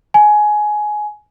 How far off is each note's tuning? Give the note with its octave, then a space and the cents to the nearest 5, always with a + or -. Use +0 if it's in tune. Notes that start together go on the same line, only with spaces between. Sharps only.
G#5 +15